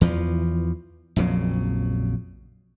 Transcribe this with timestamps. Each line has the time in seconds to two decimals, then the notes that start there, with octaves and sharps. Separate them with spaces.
0.01 E2 E3 F3
1.16 A#1 F2 C#3 F#3